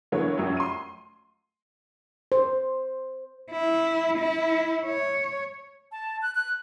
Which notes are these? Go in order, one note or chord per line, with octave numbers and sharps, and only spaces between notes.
D3 E3 F#3 A#3 B3 C#5
F1 F#2 F#3 C#4
C6 D#7
C5
E4
E4
C#5
A5
F#6
F#6